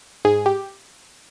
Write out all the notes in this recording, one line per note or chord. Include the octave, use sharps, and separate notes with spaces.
G#2 G#4
G4